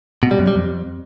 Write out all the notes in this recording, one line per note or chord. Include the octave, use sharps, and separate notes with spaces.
B2
G3
F#2
G3
F2